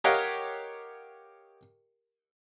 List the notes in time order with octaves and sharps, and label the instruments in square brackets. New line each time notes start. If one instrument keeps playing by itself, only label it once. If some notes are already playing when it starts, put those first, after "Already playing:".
[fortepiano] G4 A#4 C#5 D#5 F5 F#5